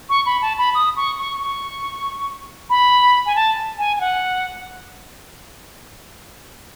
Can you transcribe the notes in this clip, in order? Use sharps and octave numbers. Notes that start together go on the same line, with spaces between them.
C#6
B5
A5
B5
D#6
C#6
C#6
C#6
B5
G#5
A5
G#5
G#5
F#5